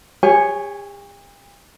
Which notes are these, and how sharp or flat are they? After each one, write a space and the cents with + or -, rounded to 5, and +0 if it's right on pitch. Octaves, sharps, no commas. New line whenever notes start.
G4 +45 C#5 +0 G#5 +0